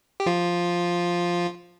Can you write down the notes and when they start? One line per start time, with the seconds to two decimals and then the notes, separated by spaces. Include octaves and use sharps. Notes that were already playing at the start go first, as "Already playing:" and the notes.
0.20 G4
0.26 F3 F4